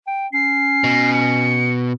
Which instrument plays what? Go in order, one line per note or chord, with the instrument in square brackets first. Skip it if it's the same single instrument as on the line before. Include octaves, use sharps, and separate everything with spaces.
[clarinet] G5
[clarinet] C#4 [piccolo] C7
[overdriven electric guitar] B2
[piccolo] C#7